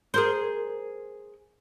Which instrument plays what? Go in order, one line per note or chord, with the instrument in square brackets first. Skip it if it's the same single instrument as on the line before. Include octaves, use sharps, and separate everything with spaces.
[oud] G#4 A#4 C5